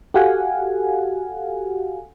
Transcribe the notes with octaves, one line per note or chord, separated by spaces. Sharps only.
F#4 G4 A4 F5 F#5 G#5